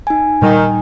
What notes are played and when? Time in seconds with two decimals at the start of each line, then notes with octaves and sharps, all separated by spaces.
0.07 D#4 G#5
0.42 A#2 D#3 G3